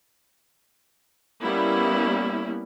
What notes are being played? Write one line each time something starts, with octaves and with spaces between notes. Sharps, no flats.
G3 A#3 B3 C#4 E4